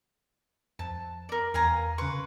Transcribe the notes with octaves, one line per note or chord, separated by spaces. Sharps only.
F2 A5
A#4 D5
E2 F5 G#5 A#5
C#3 B4 C6 C#6